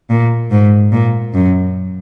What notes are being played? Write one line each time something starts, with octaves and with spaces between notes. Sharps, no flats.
A#2
G#2
A#2
F#2